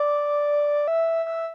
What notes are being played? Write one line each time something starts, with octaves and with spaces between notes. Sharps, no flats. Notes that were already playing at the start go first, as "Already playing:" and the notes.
Already playing: D5
E5
E5